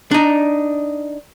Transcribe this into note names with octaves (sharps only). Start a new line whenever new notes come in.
D4 D#4